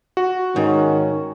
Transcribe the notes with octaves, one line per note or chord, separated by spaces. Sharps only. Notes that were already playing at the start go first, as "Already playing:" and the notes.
F#4
G#2 D#3 C#4